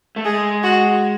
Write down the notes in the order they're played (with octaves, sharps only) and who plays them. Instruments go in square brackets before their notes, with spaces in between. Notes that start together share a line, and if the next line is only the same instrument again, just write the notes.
[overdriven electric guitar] A3
[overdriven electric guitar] G#3 [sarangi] G#4
[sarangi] F#4